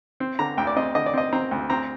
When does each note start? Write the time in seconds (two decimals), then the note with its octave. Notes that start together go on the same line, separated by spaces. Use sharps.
0.20 C4
0.39 D3 A#5
0.57 D2 G5
0.67 D5
0.76 C4 D#5
0.95 D3 D#5
1.06 D5
1.14 C4 D#5
1.33 C4 A#5
1.51 D2
1.70 C4 A#5